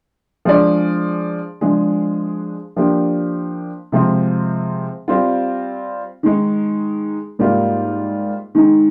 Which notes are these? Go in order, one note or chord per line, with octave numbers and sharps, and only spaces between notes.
F3 G#3 D4 G#4 D5
F3 G#3 D4 G#4
F3 A#3 D4 G4
C3 F3 G#3 C4
G3 C4 F4
D#3 G#3 D#4
G#2 G3 A#3 F4
D#3 G#3 D#4